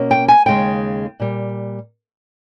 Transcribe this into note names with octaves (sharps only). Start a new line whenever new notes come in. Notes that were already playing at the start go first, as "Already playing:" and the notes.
Already playing: B2 A#3 C#4
G5
G#5
D#2 C#3 G#3 G5
A#2 G3